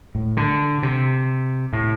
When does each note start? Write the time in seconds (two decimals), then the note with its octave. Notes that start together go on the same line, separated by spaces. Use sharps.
0.15 A2
0.37 D3
0.83 C3
1.73 A2